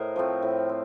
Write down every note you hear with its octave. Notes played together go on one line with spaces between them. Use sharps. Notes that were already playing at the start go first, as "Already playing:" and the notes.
Already playing: A2 A#4 C5 D#5
F3 A3 C4
A2
C4